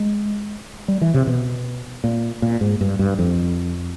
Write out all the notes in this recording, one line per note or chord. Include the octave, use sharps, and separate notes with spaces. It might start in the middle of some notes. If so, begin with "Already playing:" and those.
Already playing: G#3
G3
E3
C3
B2
A#2
A#2
G#2
G2
G2
F2